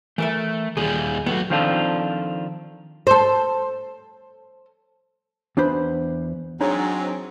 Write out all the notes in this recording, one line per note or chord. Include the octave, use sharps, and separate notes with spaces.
E3 A3 A#4 E5
D#2 G3 G#4
A2 F#3 B3
D#3 F3 C4 D4 F4 A4
A4 C5
E2 D4 B4 C5 B5
G#2 F#3 C4 D4 G#4 C#5 A#5